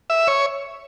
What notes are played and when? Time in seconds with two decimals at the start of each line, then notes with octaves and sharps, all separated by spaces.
0.10 E5
0.28 C#5